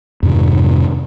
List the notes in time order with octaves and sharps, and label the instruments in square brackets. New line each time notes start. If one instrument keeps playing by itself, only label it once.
[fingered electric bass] F2 G#2 C3 D#3